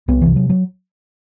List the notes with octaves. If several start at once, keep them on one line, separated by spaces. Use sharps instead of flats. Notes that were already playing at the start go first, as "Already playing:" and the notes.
C2 B3
C3 E3
F#3
F#3